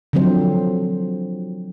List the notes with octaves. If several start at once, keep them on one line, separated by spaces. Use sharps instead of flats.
D3 F3 F#3 C4 C5